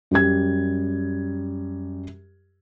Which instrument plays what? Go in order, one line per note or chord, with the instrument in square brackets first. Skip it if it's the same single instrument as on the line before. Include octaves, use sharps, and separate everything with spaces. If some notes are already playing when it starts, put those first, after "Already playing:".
[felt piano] F#2 G3 G4 G#6